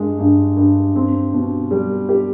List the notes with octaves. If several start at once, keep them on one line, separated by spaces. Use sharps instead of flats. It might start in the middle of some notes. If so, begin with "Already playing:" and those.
Already playing: G2 G#3
G2
G2
C4
B2
G3
G4